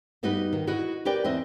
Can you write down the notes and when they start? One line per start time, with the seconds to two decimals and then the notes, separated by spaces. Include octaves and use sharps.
0.23 G2 B3 D#4 F#4 G4 B4
0.53 D#3
0.67 E4 F#4 B4 D#5 F#5
1.05 G4 A#4 B4 D5 G5
1.24 E2 C4 B4 D#5 E5